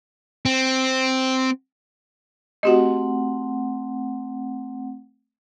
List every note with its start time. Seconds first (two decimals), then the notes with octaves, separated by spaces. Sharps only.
0.45 C4
2.63 A3 C4 F#4 G4 D#5 F#5